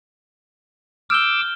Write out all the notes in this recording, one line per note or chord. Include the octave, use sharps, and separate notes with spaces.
D6 E6 F6 G6 G7